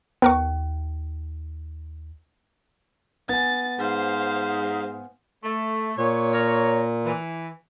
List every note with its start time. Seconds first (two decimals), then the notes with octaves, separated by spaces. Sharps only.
0.22 D#2 B3 A#4 C#6
3.29 B3 G#5 A6
3.79 G#2 C5 F5
5.44 A3
5.98 A#2 C#5
6.33 A#4 C#5
7.05 E3